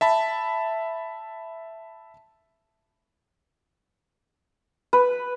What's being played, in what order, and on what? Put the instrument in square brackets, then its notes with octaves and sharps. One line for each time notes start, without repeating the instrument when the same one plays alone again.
[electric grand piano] E5 A5 B5
[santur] B4